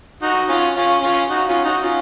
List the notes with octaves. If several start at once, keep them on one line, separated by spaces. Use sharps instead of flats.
D#4 F#4
C#4 F4
C#4 F4
C#4 F4
D#4 F#4
C#4 F4
D#4 F#4
C#4 F4